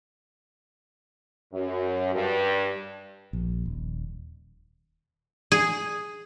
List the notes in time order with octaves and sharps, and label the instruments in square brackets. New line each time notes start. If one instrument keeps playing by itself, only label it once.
[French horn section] F#2
G2
[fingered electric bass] A#1
D#1
[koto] G#4